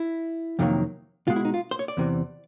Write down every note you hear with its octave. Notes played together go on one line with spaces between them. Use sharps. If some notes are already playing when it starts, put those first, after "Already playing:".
Already playing: E4
F2 C3 D#3 F#3 A#3
B2 G#3 F4
E4
D#4
F4
C5
C#5
D5
E2 C3 E3